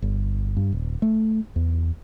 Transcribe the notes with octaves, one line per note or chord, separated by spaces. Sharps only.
G1
G2
D#1
A3
E2